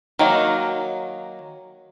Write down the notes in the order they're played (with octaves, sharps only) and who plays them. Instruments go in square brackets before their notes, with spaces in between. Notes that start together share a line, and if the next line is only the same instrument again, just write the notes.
[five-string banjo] D#3 F#3 A#3